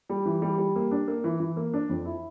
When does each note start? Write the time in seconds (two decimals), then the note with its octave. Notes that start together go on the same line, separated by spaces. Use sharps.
0.10 G3
0.26 E3
0.42 G3
0.58 G3
0.76 A#3
0.91 D4
1.08 A#3
1.24 E3
1.40 E3
1.57 A#3
1.74 D4
1.89 F2
2.05 E4